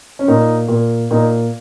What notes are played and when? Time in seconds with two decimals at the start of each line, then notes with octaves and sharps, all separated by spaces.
0.19 C#4
0.28 A#2 D#4
0.68 A#2
1.11 A#2 D#4